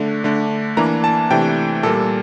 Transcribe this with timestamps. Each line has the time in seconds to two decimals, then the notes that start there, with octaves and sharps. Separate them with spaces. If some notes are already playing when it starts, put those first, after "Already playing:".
Already playing: D3 A3 D4
0.24 D3 A3 D4
0.77 E3 A#3 D4 A#5
1.04 A5
1.31 C3 E3 A3 D4 G5
1.83 A#2 G3 A#3 A4